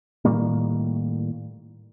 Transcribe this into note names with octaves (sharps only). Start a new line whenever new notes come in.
A2 D#3 G3 A#3